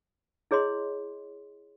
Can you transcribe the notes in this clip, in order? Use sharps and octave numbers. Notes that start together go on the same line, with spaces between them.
E4 G#4 C#5 D#5 C6